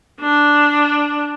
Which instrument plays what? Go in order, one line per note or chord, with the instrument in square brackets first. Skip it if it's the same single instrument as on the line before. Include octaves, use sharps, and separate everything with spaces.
[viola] D4